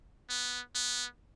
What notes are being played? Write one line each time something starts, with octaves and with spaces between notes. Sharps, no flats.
B3
B3